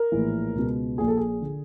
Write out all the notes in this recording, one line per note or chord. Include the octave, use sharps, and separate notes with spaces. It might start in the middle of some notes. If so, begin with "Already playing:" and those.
Already playing: A#4
A#1 A2 E3
C#2 B2
A#1 A#2 G#4
A4
G#4
D3